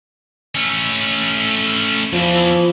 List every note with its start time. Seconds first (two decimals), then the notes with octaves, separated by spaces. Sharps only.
0.55 A3 C#4
2.13 E2 E3 F3